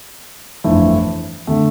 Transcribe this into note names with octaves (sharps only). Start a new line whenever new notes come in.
G1 F2 E3 A3 E4
D3 A3